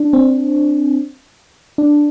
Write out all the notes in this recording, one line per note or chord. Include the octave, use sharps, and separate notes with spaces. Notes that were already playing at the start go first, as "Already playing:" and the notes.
Already playing: D4
C4
D4